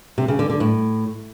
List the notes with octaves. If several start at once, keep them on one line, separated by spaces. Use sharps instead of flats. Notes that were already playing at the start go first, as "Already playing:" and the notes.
C3
C#3
D3
D3
A2